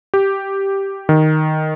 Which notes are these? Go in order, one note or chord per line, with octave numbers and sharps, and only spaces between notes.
G4
D#3